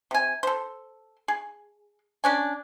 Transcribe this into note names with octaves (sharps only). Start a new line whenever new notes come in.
C3 G#5
A4 C5
G#4
C#4 D4 G#5